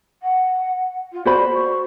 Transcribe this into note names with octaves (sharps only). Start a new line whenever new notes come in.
F#5
F4
F#4 C5 D5 B5
C#6